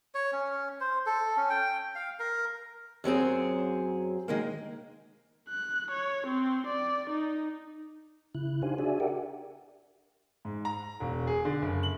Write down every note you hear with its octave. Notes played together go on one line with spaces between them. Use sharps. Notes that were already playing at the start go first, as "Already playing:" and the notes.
C#5
C#4
C5
A4
C#4
G5
F5
A#4
F#2 F#3 C4 G#4
D#3 G#3 A#3
F#6
C#5
C4
D5
D#4
C#3 E4 F#6
D4 D#4 G4 C5 F5 G#5
D4 F#4 G#4 D5 E5 G#5
G4 A#4 D5 E5 F#5 G5
G#2
A#5
E1
G#4
D3
F#1
F#7